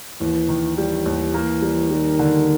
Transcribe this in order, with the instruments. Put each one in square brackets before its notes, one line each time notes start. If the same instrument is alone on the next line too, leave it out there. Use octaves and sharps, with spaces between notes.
[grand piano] D#2 [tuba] E3
[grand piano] D#3
[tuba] E3 [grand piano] G3
[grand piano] D#2
A#3
G3
[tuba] D#3 [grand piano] G3
[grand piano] D3